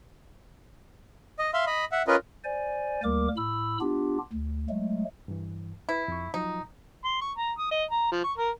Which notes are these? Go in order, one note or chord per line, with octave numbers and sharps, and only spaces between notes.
D#5
E5 F5 C6
D#5 B5
E5 F#5
C#4 F4 A#4 B4 D#5
C5 D5 G#5
D2 G3 A#3 A#4 D6
A2 B5 E6
B3 D4 F4 G4
D2
F#3 G#3 A3
G2 E3
E4 B4
F2 C#6
F3 F#3 D#4 F4
C6
C#6
A#5
D#6
D#5
A#5
F3
C#6
A#4